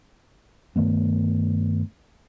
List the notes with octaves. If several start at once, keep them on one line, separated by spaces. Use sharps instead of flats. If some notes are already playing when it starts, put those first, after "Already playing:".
G2 D#3 A3 B3